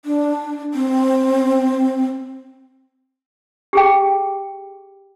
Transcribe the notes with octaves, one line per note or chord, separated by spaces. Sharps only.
D4
C4
G4 G#4 G5